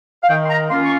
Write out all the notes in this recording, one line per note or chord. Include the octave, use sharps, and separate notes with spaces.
F5
D#3 G5
C6
A#5
A#3 C#4 F4 C6
C#6